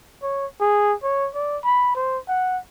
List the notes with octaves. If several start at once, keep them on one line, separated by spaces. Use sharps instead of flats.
C#5
G#4
C#5
D5
B5
C5
F#5